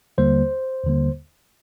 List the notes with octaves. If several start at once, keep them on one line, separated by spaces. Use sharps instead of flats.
D#2 D3 G3 A#3 C5
D#2 D3 G3 A#3